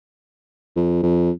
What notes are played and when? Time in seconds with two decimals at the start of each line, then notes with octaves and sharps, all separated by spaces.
0.77 F2
1.03 F2